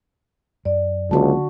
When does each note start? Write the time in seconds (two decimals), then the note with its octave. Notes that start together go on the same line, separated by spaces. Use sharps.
0.65 F#2 D5
1.11 C#2 D3 F#3 A#3 D4 F#4 A5